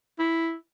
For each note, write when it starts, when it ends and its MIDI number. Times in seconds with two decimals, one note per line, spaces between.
0.19 0.55 64